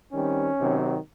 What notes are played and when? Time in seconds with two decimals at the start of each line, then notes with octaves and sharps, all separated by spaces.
0.12 D#3 G3 C4 C#4
0.59 C3 D#3 F#3